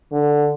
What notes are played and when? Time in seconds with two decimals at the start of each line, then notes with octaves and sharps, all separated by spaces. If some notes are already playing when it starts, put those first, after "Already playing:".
0.12 D3